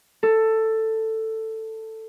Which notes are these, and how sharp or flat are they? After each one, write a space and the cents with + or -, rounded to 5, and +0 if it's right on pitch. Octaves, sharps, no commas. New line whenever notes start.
A4 +10